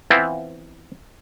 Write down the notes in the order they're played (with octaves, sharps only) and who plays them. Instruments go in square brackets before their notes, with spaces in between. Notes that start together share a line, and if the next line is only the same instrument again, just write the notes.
[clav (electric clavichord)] E3 B3 C4 E4 F4